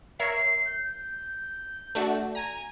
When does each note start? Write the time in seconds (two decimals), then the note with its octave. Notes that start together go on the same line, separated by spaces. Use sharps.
0.20 A#4 C#5 E5 C7
0.66 G6
1.95 A3 D4 F#4
2.35 G#5 A#5